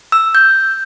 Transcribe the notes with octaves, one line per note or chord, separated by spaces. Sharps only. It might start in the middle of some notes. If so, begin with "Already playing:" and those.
E6
G6